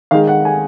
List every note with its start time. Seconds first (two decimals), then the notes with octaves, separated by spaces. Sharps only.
0.11 D#3 G#3 F5
0.27 F#5
0.45 G#5